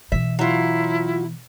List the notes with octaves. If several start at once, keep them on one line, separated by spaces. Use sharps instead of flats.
B2 E3 E5
F#3 E4 F4